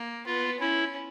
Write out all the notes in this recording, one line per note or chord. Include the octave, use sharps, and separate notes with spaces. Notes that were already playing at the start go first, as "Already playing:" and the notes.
Already playing: A#3
B3 F4
C#4 E4